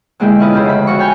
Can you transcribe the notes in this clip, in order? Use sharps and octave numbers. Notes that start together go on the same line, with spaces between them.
B2 D3 G#3 A#3 E4 G4
C#4 E4 F4 B4 C5 D#5
F2 C#3 G4 C5
D2 B5
F3 F#4 C#6
C#5 G5 G#5 B5